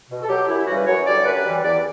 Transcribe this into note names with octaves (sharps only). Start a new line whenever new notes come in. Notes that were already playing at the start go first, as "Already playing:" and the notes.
B2
A4
F#3 G4
F#2 E4
E4
C#3 E3 G3 F#4
B4
F#2 C#5
D3 G3 D5
F#2 B4
E3 G3
E2 D5